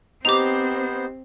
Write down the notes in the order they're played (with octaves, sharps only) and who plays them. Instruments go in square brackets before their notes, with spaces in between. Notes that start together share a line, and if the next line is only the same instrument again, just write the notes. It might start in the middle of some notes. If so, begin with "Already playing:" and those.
[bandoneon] B3 C5 [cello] C4 [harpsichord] D#4 G4 [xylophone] D6 F7